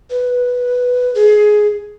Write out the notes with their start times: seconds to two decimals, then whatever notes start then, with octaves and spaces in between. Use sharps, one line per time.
0.10 B4
1.15 G#4